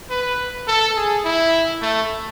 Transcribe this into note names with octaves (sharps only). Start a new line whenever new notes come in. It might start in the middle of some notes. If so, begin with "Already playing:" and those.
B4
A4
G#4
E4
A3